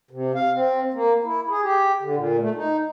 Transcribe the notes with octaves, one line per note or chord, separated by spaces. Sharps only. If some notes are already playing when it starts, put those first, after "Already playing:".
C3
F5
C4
A#3
E4
G#4
G4
D3
A#2
A3
D#4